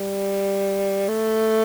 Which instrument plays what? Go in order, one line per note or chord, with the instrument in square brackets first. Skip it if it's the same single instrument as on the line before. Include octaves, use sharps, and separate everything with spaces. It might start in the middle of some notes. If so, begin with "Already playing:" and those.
Already playing: [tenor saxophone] G3
A3